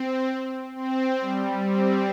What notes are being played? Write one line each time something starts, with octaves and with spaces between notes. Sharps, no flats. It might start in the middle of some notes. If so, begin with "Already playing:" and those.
Already playing: C4
C4
G3
C4